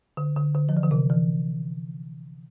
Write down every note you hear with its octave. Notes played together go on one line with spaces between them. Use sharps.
D3
D3
D3
F3
E3
D3
C3
E3